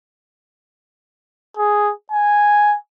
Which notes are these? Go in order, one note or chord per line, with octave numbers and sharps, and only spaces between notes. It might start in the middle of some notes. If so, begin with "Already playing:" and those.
G#4
G#5